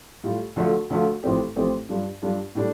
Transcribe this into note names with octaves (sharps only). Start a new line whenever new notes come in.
A2 G3 F4
D2 D3 F3 A3 F4
D2 D3 F3 A3 F4
A1 A2 F3 C4 G4
A1 A2 F3 C4 G4
G2 G3 D4 F4
G2 G3 D4 F4
A2 G3 D4